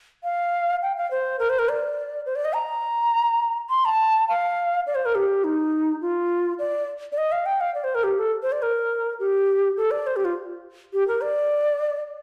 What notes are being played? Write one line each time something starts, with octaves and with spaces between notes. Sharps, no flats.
F5
G5
F5
C5
A#4
C5
A#4
D5
C5
D5
D#5
A#5
C6
A5
F5
D5
C5
A#4
G4
D#4
F4
D5
D5
D#5
F5
G5
F5
D5
C5
A#4
G4
A4
C5
D5
A#4
G4
A4
D5
C5
G4
F4
G4
A#4
D5